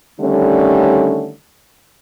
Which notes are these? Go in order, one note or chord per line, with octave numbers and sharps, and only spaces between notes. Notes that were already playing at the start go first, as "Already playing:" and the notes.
D3 D#3 G3 A3 C#4